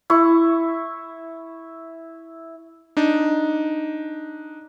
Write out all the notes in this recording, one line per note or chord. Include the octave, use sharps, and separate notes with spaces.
E4 C#6
D4 D#4